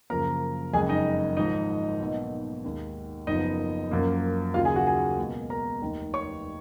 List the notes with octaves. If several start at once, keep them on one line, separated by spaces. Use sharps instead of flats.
F#2 C#3 F3 A#3 A#4 A#5
F#1 F2 C#3 G#3 G#4 G#5
D#4 D#5
G#1 G#2 F3 D#4 D#5
B1 B2 A#3
D#2 D#3 G#3
F#1 F#2 F3 B3 D#4 D#5
F#2 F3 A#3
D#2 C#3 F#3 A#3 F4 F5
G#4 G#5
F#4 F#5
G#4 G#5
C#2 B2 A#3
A#4 A#5
F1 D#2 D#3
C#5 C#6